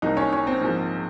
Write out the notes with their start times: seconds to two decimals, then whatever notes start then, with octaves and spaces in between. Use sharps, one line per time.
0.02 C2 C3 F#3 A#3 D#4
0.17 C#4
0.33 C#4
0.47 C4
0.62 A#1 G#2 F3 A#3